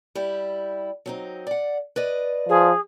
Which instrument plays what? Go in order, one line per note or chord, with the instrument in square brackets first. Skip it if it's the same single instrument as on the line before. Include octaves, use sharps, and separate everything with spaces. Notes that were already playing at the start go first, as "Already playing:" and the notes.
[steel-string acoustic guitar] G3 E4 G4
F#3 C4 D#4
D5 F#5
B4 D5 D#5
[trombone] F3 [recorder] G#4